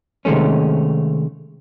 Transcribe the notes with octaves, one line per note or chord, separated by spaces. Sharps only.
C3 D#3 G#3 A3 C#4